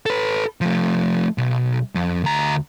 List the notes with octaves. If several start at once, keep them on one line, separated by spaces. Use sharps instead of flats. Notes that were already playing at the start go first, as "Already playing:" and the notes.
A4 B4
F3 A3
B1
F2
D2 A#5